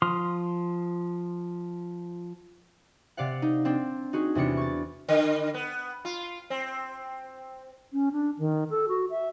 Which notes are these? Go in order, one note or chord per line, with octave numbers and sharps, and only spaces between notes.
F3 C6 D#6 F6
C3 D5 F5 F#5
D#4
C4 D4
D#4 F#4 G#4
E2 C3 D4 C#7
C#6 A6
D3
B3
F4
C4
C#4
D4
D#3
A4
F#4
E5